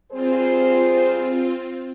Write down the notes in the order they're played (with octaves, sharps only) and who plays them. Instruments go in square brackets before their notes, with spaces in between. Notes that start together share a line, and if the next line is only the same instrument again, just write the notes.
[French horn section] G3 G#4 C5 [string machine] C4 F4